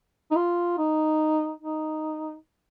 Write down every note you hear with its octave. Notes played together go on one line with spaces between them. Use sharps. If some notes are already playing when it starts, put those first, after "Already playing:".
D#4
F4
D#4
D#4